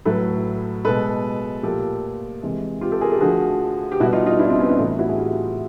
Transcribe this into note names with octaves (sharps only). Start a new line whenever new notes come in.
A2 F#3 A3 A4 B4
B2 G#3 A4 B4
A#2 F3 A3 G4 A4
C3 E3 G#3
F4 G4
G4 A4
G#4 A#4
G4 A4
D3 F3 A3 F#4 G#4
G4
B2 G3 E4 F#4
D#4 F4
D#4 F4
D4 E4
C4 D4
B3 C#4
D4 E4
A2 E3 A3 D#4 F4
E4 F#4
G#4
F4 G4